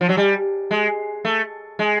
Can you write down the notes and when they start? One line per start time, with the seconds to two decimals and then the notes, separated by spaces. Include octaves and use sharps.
0.01 F3
0.09 F#3
0.17 G3
0.71 G#3
1.25 A3
1.79 G#3